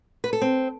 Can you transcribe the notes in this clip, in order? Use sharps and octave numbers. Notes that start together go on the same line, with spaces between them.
B4
A4
C4